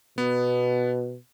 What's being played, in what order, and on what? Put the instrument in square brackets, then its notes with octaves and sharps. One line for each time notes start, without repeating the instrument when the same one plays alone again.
[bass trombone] B2 [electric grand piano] B3